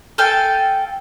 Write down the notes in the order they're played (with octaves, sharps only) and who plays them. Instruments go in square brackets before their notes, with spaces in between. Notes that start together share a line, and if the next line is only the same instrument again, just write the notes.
[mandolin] A4 F5 G5 G#5